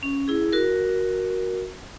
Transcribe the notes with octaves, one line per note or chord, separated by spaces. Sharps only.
C#4
E4 G#4
F#4 A#4